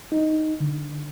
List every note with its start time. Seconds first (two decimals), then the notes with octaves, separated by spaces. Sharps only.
0.12 D#4
0.60 D3